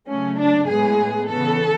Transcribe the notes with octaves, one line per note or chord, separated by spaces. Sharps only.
C#3 F#3 A3 C#4
D4
A2 G#3 B3 G#4
C#3 E3 B3 A4